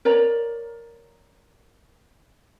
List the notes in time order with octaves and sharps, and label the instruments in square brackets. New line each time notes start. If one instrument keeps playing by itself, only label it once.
[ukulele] A#4 C#5 D5 A#5